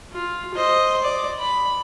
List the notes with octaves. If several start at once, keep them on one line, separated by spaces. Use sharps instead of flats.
F4
C5 D#5
D5
B5